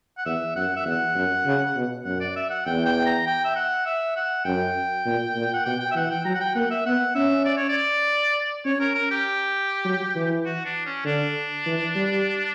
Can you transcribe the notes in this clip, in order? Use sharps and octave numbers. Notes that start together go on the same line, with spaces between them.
F#5
E2 E5
F#2 F#5
E5
E2 F#5
F#2
C#3
B2
F#2 F#5
D5
E5
F#5
E2 G5
G5
A#5
G5
E5
F#5
E5
F#5
F#2 G5
A#2
A#2
F#5
B2 G5
G5
E5
E3 F#5
G5
F#3 A#5
F#5
G5
A#3 F#5
E5
B3 F#5
C#4 E5
D5
C#5
D5
C#4 C#5
A#4
A#4
G4
F#3
E3
F#4
D4
C#4
D3 D4
E3
G3